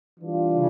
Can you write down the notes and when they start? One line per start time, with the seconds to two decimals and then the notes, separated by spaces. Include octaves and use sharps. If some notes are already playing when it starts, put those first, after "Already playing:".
0.20 E3 G3 D4 F4
0.54 C#3